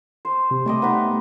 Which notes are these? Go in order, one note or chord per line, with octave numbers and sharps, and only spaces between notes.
C5
C3
G3 A3 D5 D#5
B3 D#4 B4